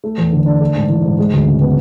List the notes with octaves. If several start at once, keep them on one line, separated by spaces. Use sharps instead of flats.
A3
E2
D3
D4
A3
G#2
E3
G#2
G#3
D2
C#3
B3